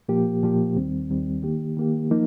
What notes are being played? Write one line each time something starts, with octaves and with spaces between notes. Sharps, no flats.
A#2 F3 A#3 G4
A#2 F3 A#3 G4
D#2 D#3 G3 C4
D#2 D#3 G3 C4
D#3 A#3 G4
D#3 A#3 G4
F3 A#3 D#4